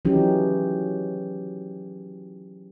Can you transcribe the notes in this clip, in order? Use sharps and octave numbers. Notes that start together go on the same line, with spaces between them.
E3 F#3 C#4 D#4 G4 G#4